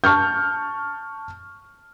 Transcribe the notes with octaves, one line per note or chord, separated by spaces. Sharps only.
A5 C#6 F6 G6